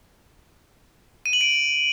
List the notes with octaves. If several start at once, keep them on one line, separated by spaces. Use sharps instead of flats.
D#7
F#7
D7